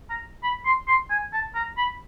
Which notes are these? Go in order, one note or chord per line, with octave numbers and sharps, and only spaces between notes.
A#5
B5
C6
C6
G#5
A5
A#5
B5